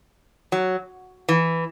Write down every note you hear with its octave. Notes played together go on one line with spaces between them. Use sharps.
F#3
E3